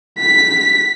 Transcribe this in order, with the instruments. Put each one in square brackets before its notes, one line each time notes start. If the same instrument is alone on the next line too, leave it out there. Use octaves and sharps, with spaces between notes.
[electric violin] B6